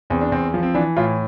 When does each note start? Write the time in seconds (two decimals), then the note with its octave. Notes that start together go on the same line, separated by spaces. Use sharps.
0.10 E2 C4
0.21 D4
0.32 E2 C4
0.54 F3
0.63 C4
0.75 E3 D4
0.97 A2 F4